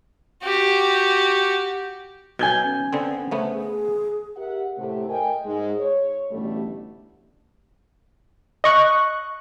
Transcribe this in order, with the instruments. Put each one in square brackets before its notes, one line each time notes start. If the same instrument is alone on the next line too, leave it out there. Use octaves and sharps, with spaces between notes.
[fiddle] F#4 G4
[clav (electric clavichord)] B2 F#3 [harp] G#5 G6 G#6
[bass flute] C#4
[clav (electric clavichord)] D3 B3 C4
[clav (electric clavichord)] C#3 A3 B3 [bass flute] C5
[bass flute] G#4
[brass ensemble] G4 A#4 E5 F#5
A2 C3 A3
A#4 D#5 G5 G#5
G#2 G#3
C#5
A1 B2 D3 G3 A3
[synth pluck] D#5 C#6 F#6